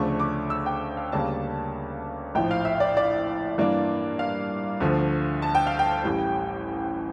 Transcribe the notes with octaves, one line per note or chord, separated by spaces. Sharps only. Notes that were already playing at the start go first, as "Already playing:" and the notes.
Already playing: D2 C#3 F3 A3 D4 C#6
D6
E6
G5
F5
D2 C#3 G3 A#3 D4 A5
A#1 A2 F3 G5
F5
E5
D5
D5
G2 E3 A#3 D4
F5
D2 D3 F3
A5
G5
F5
G5
A1 A2 G3